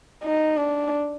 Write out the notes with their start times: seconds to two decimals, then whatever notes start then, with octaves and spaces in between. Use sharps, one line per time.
0.23 D#4
0.57 D4